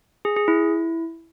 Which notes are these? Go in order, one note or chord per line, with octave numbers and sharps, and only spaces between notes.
G#4
G#4
E4